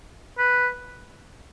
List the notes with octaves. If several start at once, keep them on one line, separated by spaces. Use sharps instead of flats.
B4